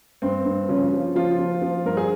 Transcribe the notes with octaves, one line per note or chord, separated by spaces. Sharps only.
G2 C4
G2
C#3 F3 C#4
F3
F3 F4
F3
F3
G2 A#4
G#4